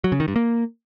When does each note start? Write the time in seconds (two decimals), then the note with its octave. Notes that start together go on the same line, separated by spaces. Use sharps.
0.04 F#3
0.12 C#3
0.20 D#3
0.28 G2
0.36 A#3